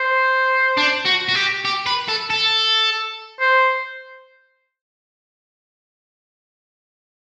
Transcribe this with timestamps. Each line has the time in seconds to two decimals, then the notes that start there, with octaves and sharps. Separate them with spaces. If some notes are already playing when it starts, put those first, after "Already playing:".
Already playing: C5
0.77 D4
1.06 F#4
1.29 F#4
1.35 G4
1.65 G4
1.86 B4
2.08 A4
2.30 A4
3.40 C5